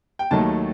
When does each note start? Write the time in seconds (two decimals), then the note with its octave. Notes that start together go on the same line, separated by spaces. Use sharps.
0.19 G5
0.31 D#2 D#3 F#3 A3 A5